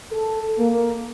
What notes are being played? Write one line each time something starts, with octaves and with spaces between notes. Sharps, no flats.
A4
A#3